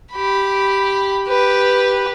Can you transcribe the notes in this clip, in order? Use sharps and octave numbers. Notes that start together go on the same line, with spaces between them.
G4 B5
G4 B4